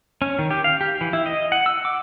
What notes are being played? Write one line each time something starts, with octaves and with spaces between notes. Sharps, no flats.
C#4
D#3
G4
F5
G4
E3
E4
D#5
F#5
E6
D6